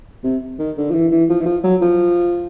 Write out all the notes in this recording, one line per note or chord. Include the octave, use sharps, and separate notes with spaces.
C3
D#3
D3
F3
E3
E3
F3
E3
F3
F#3
F3